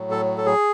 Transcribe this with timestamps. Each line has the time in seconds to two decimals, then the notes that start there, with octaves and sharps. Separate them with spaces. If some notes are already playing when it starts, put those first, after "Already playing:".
Already playing: A2 F#3
0.11 A4
0.38 A4
0.46 G#4